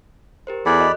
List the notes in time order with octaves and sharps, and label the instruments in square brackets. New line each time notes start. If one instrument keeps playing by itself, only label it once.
[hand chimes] G4 A#4 C5
[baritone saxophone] E2 [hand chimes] A4 F#6 G6 [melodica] D5 B5
[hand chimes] F#4 D#5